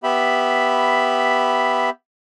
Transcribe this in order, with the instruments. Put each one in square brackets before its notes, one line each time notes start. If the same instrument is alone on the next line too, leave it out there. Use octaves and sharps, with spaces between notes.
[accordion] B3 G4 E5 B5